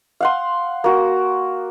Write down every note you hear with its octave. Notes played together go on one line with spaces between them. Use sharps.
F5 F#5 C6
A#3 F#4